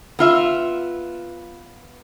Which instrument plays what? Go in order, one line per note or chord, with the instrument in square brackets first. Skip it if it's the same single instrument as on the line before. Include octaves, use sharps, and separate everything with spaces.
[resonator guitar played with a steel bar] B3 F4 E5